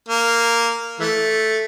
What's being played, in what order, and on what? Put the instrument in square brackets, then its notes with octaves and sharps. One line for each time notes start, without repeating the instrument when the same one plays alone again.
[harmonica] A#3
E3 A3